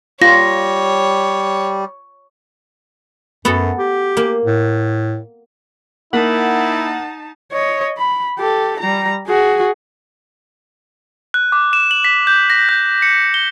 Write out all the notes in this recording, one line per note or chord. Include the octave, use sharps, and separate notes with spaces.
G3 F4 C#5 A#6
F#2 B3 F#4 A4
G4
A#3
A2
A#3 D#4 E4 F#5 A5 B6
C#5 D#5
B5
G4 A4
G3 A#5
F#4 G#4
F#6
D6
E7
F#7
B6
G6
A#6
G6
C#7
G7